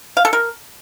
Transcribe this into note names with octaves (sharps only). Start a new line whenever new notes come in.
F5
A4
A#4